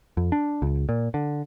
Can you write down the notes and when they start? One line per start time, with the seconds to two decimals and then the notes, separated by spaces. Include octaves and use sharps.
0.17 F2
0.32 D4
0.62 C#2
0.89 A#2
1.14 D3